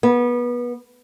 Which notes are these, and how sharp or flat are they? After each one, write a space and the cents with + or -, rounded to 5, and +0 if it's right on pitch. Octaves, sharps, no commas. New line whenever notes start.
B3 -25